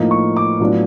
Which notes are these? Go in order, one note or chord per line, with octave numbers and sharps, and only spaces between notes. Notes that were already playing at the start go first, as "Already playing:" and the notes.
Already playing: A2 F3 A#3 D#4
C#6
D6
A2 F#3 B3 D4 F4